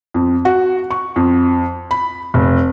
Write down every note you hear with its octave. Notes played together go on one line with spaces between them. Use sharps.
F2
F#4
C#6
F2
B5
F1